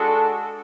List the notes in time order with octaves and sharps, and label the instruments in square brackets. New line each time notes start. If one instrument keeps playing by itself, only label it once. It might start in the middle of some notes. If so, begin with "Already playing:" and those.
Already playing: [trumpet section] G#3 D4 F#4 A4